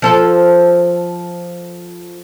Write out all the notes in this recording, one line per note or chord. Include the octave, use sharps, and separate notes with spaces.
F3 A4